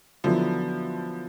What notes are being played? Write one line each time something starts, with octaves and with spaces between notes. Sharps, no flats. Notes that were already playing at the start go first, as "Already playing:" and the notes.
D3 F3 F#3 B3 E4